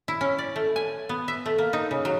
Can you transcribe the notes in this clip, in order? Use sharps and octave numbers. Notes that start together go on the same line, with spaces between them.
E4
C#4
D5
A3
G#5
B3
E5
A3
A#3
D#4
C#3
F#3